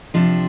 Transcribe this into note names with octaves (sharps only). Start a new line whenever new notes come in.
C3 F3 D4